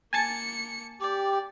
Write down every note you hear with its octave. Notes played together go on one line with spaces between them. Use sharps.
A#3 G#5 A5 A6 C#7
G4 D5